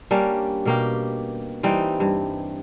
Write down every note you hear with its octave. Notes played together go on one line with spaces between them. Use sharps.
G3 A#3 C#4 D4
B2 A#3 G4
E3 G3 C4 D#4
G2